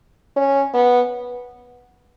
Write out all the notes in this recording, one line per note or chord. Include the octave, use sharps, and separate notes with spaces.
C#4
B3